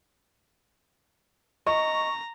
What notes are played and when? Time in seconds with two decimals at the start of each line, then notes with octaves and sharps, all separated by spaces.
1.67 D#5 A#5 C#6